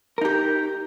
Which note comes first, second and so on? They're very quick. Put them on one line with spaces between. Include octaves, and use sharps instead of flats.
A#4 D#4 G4